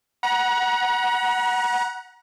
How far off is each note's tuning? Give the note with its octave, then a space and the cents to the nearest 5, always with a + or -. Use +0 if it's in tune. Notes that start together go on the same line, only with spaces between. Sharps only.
F#5 +0 A#5 +40